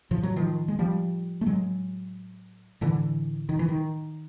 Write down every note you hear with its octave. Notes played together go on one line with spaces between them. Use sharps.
A2 F3
F#3
D#3 F3
G#3
F3 G3
A3
A2 F#3 G#3
A2 D3 E3
D#3
E3
D#3